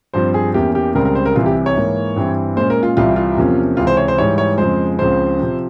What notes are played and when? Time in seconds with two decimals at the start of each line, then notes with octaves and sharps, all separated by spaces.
0.14 G2 F3 C4 C5
0.34 G#4
0.54 E2 E3 A#3 C#4 G4
0.75 G4
0.95 C#2 C#3 G3 C4 A#4
1.05 A#4
1.15 C5
1.25 A#4
1.36 C2 C3 E3 F4
1.46 G4
1.66 C#5
1.76 G#2 E3 A#3
2.16 G2 E3 G3 C4
2.56 A#2 G#3 C#4 C5
2.70 A#4
2.83 F4
2.97 C2 C3 E3 G3 F4
3.16 F4
3.37 E2 C3 F3 A#3 C#4
3.77 C#2 C3 E3 F4
3.87 C5
3.97 C#5
4.08 C5
4.18 G#2 E3 G3 C#5
4.38 C#5
4.58 F2 C#3 F3 G#3 C5
4.99 C#2 C#3 F3 C4 C5
5.39 C3 F3 C4